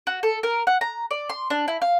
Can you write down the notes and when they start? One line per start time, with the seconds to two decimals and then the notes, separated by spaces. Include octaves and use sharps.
0.07 F#4
0.23 A4
0.43 A#4
0.67 F#5
0.81 A#5
1.11 D5
1.29 C6
1.50 D4
1.68 E4
1.82 F5